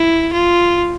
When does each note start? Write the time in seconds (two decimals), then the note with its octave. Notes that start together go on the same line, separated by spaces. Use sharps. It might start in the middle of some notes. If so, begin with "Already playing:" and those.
Already playing: E4
0.33 F4